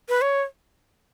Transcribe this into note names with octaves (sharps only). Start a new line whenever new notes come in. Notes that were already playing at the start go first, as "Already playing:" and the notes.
B4
C#5